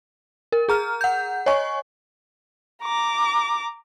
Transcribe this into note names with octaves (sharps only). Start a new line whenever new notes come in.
A#4
G#4 A#5 F6
F#5 G6
C#5 D#5 G#5 C#6
A#5 D6